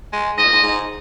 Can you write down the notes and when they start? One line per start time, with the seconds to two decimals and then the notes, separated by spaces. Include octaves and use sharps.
0.13 G#3
0.37 G#2 D#5
0.45 A#2
0.52 G#2
0.63 G#2